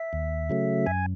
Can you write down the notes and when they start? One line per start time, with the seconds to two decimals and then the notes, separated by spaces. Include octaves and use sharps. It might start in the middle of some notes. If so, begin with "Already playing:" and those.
Already playing: E5
0.13 D#2
0.50 C#3 F#3 A3
0.86 F#2 G#5